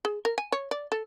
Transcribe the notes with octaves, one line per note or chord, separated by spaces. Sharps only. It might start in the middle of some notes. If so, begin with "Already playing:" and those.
G#4
A#4
G#5
C#5
D5
A4